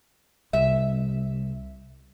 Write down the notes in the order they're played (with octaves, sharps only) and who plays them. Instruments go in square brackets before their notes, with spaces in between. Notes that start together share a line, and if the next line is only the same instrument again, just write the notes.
[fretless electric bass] C2 [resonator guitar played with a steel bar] E5